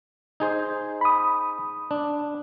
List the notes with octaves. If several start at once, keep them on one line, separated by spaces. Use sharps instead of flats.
D#4 G#4 C5
B5 D#6
D4